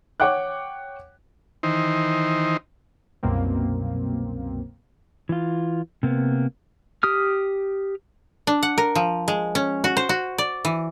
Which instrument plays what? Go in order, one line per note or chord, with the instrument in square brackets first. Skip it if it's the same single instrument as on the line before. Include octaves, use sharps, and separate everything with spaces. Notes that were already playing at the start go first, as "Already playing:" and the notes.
[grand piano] C#5 F#5 G5 D6 F#6
[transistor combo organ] D#3 E3 D#4 C5
[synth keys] C2 F#2 B2 A#3 C4
[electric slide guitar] E3 F4
C3 A#3 B3
[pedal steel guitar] G4 D#6 F6
[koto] D4
F#5
A#4
F3
G#3
C#4
F#4
C5
F#4
D5
E3